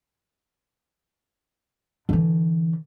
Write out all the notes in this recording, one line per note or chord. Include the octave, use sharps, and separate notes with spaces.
D3 E3